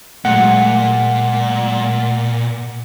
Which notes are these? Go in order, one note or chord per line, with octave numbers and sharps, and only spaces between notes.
A#2 F#3 G#3 A3 F#5